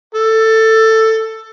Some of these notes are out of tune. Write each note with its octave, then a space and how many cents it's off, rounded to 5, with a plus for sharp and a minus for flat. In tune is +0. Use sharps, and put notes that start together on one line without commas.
A4 +15